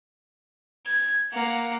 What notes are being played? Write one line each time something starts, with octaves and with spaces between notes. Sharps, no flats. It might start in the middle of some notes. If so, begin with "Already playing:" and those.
G#6
A#3 F#5